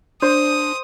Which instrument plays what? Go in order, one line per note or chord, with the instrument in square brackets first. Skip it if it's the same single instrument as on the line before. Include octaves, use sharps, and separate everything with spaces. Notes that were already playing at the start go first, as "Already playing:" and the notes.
[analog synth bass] D4 [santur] C5 [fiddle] D#6